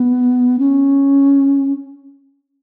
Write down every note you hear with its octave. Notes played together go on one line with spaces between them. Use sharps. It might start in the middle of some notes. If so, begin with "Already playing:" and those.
Already playing: B3
C#4